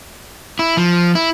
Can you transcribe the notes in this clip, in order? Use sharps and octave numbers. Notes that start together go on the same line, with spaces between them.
E4
F3
E4